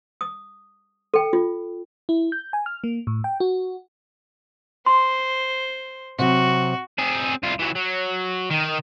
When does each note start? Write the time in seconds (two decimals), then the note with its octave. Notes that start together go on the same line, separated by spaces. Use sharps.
0.21 D#6
1.14 A4 G5
1.33 F4
2.09 E4
2.32 G6
2.53 G#5
2.66 F6
2.84 A#3
3.07 A2
3.24 G5
3.40 F#4
4.86 C5 C6
6.19 C3 F#3 F#4
6.99 C4 G#4
7.43 C2 F4
7.60 E3 F#3
7.76 F#3
8.50 D#3